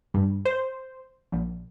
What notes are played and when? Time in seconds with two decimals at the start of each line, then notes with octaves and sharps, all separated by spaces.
0.14 G2
0.45 C5
1.32 A#1